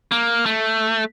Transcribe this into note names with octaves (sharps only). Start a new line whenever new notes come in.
A#3
A3